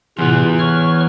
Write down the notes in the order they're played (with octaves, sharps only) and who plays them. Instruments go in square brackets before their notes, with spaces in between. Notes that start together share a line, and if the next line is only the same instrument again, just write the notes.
[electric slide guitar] E2 B3 [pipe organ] A2 C3 F4
[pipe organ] C#5 C#6 F6